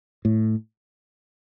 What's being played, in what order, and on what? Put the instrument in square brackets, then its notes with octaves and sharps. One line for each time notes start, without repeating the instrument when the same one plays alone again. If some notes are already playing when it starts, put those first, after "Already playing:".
[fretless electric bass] A2